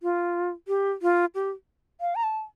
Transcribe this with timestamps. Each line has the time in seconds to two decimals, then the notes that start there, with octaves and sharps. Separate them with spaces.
0.03 F4
0.68 G4
1.02 F4
1.35 G4
2.01 F5
2.15 A#5
2.23 A5